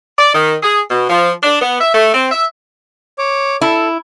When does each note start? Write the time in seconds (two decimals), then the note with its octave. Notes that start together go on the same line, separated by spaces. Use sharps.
0.19 D5
0.35 D#3
0.63 G#4
0.91 B2
1.10 F3
1.43 D4
1.62 B3
1.81 E5
1.95 A3
2.14 C4
2.32 E5
3.18 C#5 D6
3.61 E4 A4